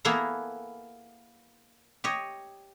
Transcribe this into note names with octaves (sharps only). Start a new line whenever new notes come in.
A#3 B3 E4 G#4 A4 A#5
G4 C#5 D#5